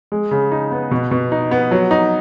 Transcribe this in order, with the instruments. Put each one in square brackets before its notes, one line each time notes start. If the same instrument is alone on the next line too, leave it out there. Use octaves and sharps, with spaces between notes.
[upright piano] G#3
C#3
D#4
B3
B2
B2
D#4
B3
F#3
D#4